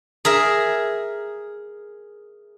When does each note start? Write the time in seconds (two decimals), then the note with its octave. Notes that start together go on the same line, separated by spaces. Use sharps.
0.25 G#4 A#4 E5